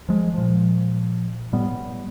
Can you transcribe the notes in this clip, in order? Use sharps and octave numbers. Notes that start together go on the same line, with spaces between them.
F3 G#3
A#2 F3
A2 G3 B3